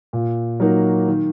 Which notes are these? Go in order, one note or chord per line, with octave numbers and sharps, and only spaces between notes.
A#2
F#3 A#3 D#4 F#4
D#3